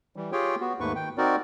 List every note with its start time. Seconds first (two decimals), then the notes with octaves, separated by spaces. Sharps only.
0.16 E3 G3
0.32 F4 G4 G#4 C#5 G5
0.60 B3 F#4
0.80 D#2 G#2 A3 A#3 B4 C#6
0.95 D#3 G5
1.18 C4 D#4 F#4 A#4 D5